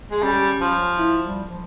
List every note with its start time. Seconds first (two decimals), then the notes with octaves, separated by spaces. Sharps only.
0.11 G#3
0.22 G3 C#4
0.61 F3
0.98 E4
1.24 G3
1.49 F3